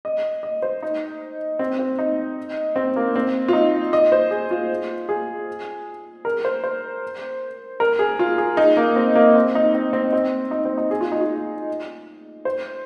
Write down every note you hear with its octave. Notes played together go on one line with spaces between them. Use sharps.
D#5
D#5
C5
D#4
C4
C4
D#4
C4
A#3
C4
F4
D#4
D#5
C5
G#4
F4
G#4
A#4
C5
C5
A#4
G#4
F4
G#4
D#4
A#3
C4
A#3
C4
D#4
C4
C4
C4
D#4
C4
D#4
G#4
F4
D#4
F4
C5